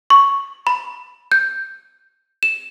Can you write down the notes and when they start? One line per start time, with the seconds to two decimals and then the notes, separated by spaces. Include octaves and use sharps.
0.10 C#6
0.67 B5
1.32 G6
2.43 E7